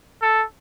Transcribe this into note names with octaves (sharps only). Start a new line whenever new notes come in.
A4